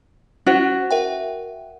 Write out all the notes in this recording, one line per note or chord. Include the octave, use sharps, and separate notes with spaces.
C#4 E4 F#4 C5
A#4 E5 G5